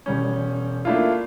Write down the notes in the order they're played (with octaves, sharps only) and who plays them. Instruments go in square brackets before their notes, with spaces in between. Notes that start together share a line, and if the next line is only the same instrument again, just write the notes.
[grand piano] E1 G3 C#4
A3 A#3 D4 E4 F4